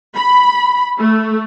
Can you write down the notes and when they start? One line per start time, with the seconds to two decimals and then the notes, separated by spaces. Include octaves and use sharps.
0.15 B5
0.98 A3